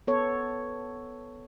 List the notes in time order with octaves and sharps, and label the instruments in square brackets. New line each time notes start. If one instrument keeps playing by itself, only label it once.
[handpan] B3 A4 C#5